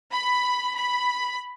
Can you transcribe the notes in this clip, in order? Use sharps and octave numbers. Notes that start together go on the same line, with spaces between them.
B5
B5